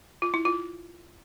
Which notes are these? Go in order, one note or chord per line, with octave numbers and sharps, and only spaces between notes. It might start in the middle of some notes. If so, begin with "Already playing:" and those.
F4
E4
F4